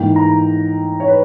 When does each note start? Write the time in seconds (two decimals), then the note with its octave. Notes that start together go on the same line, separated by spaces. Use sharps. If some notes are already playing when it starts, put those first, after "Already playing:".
Already playing: G#2 E3 A#3 G5
0.16 A#5
1.00 C#5
1.08 B4